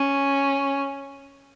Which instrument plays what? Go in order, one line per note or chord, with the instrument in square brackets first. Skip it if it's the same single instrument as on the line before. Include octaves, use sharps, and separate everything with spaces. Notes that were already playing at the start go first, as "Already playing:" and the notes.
Already playing: [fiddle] C#4